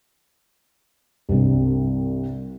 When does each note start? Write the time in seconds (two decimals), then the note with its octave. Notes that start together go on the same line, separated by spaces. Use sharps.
1.29 C2 G2 C3